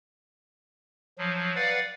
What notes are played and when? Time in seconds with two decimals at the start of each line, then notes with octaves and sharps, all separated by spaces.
1.18 F3 F#3
1.56 B4 D5 F5 F#5